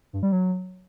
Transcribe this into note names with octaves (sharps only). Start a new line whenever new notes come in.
G2
G3
F#3